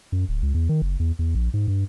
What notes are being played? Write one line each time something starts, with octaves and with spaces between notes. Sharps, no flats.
F#2
D1
C#2
E2
D#3
F#1
E2
E2
A#1
G#2
G2